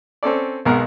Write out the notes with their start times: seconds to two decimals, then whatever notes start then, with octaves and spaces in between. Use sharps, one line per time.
0.23 C4 C#4 A4 D5
0.66 B1 B2 G#3 A#4 F#5